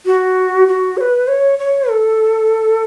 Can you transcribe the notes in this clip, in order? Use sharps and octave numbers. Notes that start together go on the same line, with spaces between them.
F#4
F#4
C#5
B4
C#5
C#5
A4